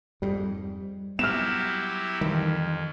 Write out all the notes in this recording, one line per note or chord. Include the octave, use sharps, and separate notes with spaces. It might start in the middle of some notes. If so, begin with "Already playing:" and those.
F2 G#2 G3
F#3 B3 E4 G4 F6 E7
F2 D#3 E3 G3